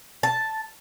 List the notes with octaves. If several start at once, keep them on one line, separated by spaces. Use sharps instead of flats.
A5